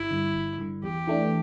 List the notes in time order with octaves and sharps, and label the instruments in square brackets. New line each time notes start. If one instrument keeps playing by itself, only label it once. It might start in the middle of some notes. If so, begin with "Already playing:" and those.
Already playing: [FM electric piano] G1 [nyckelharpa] E4
[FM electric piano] G2 D3
G1
G2 D3
[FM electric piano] E2 [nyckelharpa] G4
[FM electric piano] E3 A3 D4